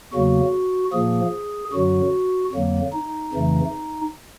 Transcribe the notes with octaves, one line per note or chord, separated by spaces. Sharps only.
E2 C#3 F#3 A#3 F#4
A#2 F3 A#3 G#4
F#2 D3 F#3 F#4
F2 D3 F#3 A#3
D#4
F2 C#3 E3 A3